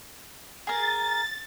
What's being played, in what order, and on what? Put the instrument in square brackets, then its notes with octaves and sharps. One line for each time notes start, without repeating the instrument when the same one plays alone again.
[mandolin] G#4 A#4 [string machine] A6